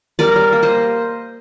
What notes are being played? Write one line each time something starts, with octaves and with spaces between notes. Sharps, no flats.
G3 A#4 D5
G3
A#3
C5 D#5